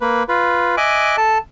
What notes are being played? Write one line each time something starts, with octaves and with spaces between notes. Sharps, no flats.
A#3 B4
F4 B4
D#5 E5 G#5 D6 F#6
A4 A5